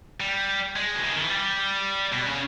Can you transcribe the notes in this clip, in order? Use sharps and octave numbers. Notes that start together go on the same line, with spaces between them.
G3
G#3
B2
C#3
D#3
E3
G3
B2
C#3